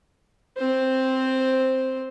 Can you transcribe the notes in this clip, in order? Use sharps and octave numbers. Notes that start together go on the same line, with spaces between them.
C4 C5